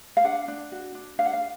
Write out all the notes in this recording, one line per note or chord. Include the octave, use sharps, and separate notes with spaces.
F5
D4 F#5
D4
F#4
D4
D4 F5
F#5
F5